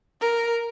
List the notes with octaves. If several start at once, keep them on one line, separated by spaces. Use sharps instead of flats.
A#4